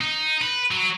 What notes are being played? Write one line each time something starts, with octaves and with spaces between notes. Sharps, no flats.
D#4
B4
F#3